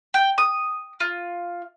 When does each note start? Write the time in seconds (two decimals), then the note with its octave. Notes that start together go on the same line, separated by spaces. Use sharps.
0.14 G5
0.38 D#6
1.00 F4